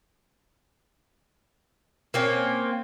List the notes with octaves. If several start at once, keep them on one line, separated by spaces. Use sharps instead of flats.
A#3 C4 C#4